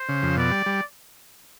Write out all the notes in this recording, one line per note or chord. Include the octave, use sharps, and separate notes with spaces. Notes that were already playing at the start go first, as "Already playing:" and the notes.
Already playing: C5
C#3
F2
B2 D5
G3
G3